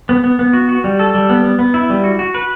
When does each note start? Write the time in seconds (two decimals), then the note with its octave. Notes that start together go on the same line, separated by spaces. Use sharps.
0.09 B3
0.24 B3
0.39 B3
0.53 F#4
0.69 F#4
0.84 G3
0.99 A4
1.15 G3
1.29 B3
1.44 B3
1.59 B3
1.74 E4
1.90 G3
2.04 F#4
2.19 F#4
2.34 B4